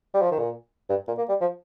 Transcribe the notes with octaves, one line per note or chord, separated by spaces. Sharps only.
G3
F3
D#3
A#2
G2
A#2
A#3
G3
F3